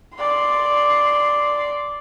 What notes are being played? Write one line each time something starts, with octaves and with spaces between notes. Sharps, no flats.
D5 C6